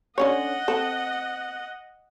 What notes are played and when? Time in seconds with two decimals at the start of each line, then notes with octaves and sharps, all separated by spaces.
0.18 D3 C#4 C#5 D#5 F#5
0.68 C4 A4